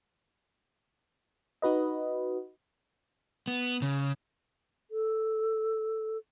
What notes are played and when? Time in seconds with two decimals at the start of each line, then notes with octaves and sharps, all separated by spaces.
1.62 D#4 F#4 B4 D#5
3.48 B3
3.82 C#3
4.90 A4